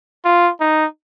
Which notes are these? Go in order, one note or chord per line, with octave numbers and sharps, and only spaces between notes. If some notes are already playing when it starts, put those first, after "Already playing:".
F4
D#4